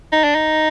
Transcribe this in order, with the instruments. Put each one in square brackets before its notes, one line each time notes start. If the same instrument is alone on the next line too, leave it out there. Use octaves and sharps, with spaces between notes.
[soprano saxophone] D#4
D4
D#4